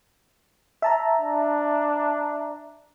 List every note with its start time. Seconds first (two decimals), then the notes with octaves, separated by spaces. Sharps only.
0.82 E5 A5 A#5
1.20 D4